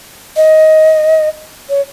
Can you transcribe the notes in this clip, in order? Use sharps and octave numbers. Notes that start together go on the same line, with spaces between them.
D#5
C#5